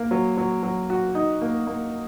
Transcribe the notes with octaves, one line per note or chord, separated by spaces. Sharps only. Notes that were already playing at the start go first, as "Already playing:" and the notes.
Already playing: A#3
F#3
F#3
F#3
F#4
D#4
A#3
A#3